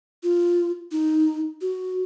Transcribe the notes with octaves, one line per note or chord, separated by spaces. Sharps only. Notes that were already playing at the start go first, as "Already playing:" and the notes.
F4
D#4
F#4